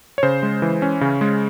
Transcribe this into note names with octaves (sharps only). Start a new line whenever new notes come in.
C#5
C#3 C5
G#3
E3
C#4
C#3
G#3